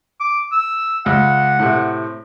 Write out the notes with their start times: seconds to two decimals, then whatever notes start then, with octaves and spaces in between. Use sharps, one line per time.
0.20 D6
0.52 E6
1.06 C#2 F#5
1.60 A2 C3